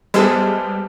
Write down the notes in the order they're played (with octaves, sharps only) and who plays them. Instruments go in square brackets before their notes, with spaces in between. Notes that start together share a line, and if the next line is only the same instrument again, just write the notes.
[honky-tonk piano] G3 B3 [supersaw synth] G#3 [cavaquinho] A4 C5 E5